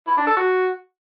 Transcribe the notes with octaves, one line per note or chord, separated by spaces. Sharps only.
E4
D4
A4
F#4